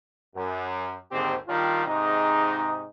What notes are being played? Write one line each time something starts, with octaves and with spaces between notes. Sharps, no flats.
F#2
G#1 D#2 G#2 D3 C4 G4
D#3 G3 D4 F4
G#2 C3 G#3 D#4